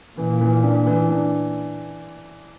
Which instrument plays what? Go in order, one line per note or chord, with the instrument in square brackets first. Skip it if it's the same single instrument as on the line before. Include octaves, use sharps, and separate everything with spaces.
[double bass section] A#2 [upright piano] E3
[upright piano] E3
D4
E3
D4